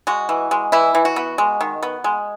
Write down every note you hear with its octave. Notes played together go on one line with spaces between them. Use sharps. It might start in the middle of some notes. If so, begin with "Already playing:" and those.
G#3 F#4
E3
G#3
E3 E4
E3
F#4
B3
G#3
D#3
B3
G#3